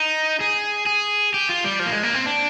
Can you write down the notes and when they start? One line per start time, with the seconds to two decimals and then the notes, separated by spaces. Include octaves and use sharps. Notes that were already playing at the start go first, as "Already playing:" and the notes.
Already playing: D#4
0.41 G#4
0.86 G#4
1.34 G4
1.49 F4
1.64 G3
1.79 F3
1.86 A#3
1.92 G#3
2.03 A#3
2.14 C4
2.26 D4